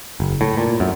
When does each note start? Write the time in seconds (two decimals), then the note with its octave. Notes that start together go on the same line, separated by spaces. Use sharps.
0.20 F#1
0.41 A2
0.57 A#2
0.80 F#2